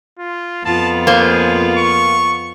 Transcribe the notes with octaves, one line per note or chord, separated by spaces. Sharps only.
F4
F2 B3 F4 A5
A#3 G#4 C5
C#6